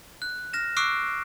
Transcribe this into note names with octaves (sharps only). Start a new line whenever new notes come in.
F#6
F6 A#6 E7
C#6 D6 E6 F#6 C7 D7